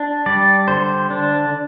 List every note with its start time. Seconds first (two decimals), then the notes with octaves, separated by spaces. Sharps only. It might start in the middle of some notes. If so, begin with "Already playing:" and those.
Already playing: D4
0.26 G3 D5
0.68 D3 C5
1.10 D4